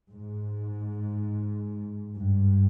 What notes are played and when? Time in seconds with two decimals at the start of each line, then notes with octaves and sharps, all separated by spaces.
0.11 G#2
2.16 G2